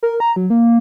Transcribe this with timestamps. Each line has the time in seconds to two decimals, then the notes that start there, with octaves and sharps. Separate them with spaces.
0.03 A#4
0.20 A#5
0.36 F#3
0.50 A#3